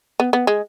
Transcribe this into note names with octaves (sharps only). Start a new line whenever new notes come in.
B3
B3
G#3